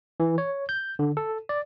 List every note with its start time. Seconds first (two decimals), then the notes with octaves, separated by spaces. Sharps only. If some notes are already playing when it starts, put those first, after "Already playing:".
0.20 E3
0.38 C#5
0.69 G6
0.99 D3
1.17 A4
1.49 D5